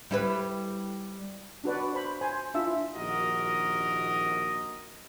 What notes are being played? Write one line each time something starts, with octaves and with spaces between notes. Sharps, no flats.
G3 E4 B4
D4 F#4 B4 D5
C5 B5
C5 G#5 C6
D4 E4 F4 E5 E6
A#1 D#2 F#4 A#4 D#5